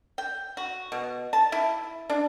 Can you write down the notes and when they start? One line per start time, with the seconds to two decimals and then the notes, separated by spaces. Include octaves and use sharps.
0.18 G5
0.57 F#4
0.92 B2
1.33 A5
1.52 E4
2.10 D4